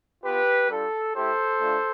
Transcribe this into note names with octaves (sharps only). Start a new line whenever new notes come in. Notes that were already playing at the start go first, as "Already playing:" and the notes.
B3 F4 G4 B4
G3 D4 F4 A4
A3 E4 G4 A4 C5
A3 D4 F4